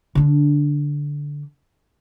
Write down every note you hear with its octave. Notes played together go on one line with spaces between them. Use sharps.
D3 D4